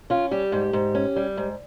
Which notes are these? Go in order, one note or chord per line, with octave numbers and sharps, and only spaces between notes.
C#4 F4
G3 G4
G#2
G#2
C#4
G3
G#2